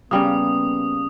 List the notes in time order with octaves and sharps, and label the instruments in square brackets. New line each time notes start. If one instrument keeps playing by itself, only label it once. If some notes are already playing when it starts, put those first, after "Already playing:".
[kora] C#3 G3 A#3 [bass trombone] B3 [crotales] D#6